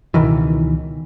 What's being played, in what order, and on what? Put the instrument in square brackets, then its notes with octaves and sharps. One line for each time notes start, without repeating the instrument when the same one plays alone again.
[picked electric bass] C#2 B2 D#3 E3